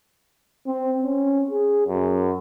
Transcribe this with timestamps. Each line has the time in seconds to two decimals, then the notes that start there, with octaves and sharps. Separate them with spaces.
0.67 C4
1.03 C#4
1.50 G#4
1.87 F#2